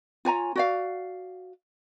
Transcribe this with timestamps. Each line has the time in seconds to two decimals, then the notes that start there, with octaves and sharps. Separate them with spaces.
0.25 F4 C#5 G#5 A#5
0.56 F#4 D5 F5